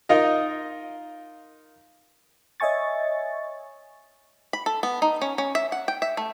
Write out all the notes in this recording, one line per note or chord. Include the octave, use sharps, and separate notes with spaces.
D#4 F4 A#4 D#5
C#5 D#5 E5 G#5 C#6 A6
B5
A4
B3
D#4
C#4
C#4
E5
F#5
G5
E5
A3